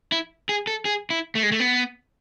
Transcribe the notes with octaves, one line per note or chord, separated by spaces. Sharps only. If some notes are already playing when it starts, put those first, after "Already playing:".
E4
G#4
A4
G#4
E4
A3
G#3
A3
B3